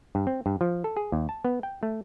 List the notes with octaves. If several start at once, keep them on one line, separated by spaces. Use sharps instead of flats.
G2
C4
G2
F3
A4
G#4
D#2
A5
B3
G5
A3